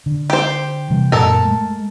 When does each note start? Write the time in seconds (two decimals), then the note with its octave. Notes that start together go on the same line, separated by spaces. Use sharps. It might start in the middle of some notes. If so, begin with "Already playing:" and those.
0.06 D3
0.30 G4 C5
0.90 C3 E3 G3
1.12 F#2 A#2 A4 A#4
1.45 G#3 A3